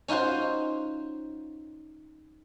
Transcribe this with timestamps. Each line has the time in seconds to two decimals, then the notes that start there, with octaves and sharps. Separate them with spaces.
0.08 C#4 D#4 F4 F#4 C5